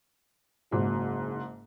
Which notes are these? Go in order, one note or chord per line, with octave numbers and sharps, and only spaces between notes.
F#1 G#2 F#3